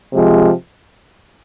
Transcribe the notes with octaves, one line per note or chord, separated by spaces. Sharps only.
C3 F3 G#3